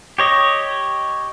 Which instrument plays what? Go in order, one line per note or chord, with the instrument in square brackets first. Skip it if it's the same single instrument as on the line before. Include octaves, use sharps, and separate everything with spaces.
[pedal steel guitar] G4 C#5 D#5